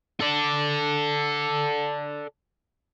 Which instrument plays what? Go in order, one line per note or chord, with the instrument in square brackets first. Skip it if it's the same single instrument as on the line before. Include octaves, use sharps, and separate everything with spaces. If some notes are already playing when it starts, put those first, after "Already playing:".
[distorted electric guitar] A4 D5